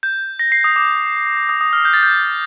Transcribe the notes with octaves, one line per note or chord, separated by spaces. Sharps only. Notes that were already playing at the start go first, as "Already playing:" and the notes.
G6
A#6
C7
D#6
D6
D#6
D#6
F6
G6
A6
G6